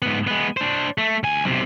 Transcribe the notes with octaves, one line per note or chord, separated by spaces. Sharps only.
G#2 B3
G#3 B3
D4 C5
A3
D2 G#5
B1 C3